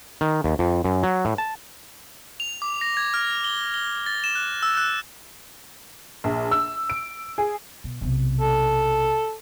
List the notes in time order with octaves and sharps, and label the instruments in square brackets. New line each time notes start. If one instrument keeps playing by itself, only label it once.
[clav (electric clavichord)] D#3
D#2
F2
F#2
F#3
A2
A5
[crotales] F7
D6
A#6
G#6
F6
G7
G7
A6
E7
F#6
E6
F#6
[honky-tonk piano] A#1
E6
D7
G#4
[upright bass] B2
B1 C3
[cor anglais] A4